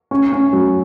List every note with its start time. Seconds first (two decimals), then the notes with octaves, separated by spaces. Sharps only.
0.11 C#4
0.32 C#4
0.53 F#3